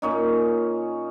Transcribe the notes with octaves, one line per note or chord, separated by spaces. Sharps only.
A#2 C#4 D#4